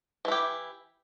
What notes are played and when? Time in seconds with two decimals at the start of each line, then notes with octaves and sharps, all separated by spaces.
0.25 E3
0.28 E4
0.32 G4